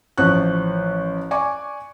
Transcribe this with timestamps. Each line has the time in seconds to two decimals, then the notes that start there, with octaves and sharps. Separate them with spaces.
0.18 A1 F3 C#6 F#6
1.31 D5 G#5 C#6 D6